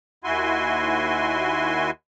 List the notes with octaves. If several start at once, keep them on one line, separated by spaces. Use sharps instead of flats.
D#2 E4 F#4 G#5 C6